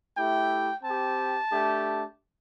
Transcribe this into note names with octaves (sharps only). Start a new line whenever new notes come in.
A3 E4 G4 G5
C4 G4 A5
A3 D4 G4